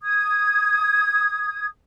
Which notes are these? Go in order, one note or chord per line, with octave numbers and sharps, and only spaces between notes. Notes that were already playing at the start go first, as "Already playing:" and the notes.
D#6 G#6